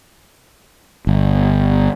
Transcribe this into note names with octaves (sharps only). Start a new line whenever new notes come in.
G1